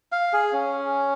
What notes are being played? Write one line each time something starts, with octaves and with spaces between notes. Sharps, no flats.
F5
G#4
C#4